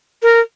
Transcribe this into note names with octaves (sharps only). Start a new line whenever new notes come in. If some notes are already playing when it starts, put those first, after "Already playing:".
A#4